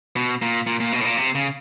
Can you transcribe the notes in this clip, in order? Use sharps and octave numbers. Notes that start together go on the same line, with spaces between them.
B2
A#2
A#2
A#2
B2
A2
A#2
C3
C#3